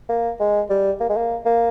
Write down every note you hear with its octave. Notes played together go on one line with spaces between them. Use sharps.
A#3
G#3
G3
A#3
G#3
A#3
A#3